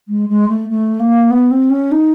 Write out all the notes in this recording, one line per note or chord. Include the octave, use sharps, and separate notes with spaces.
G#3
G#3
A3
A3
A#3
B3
C4
C#4
D#4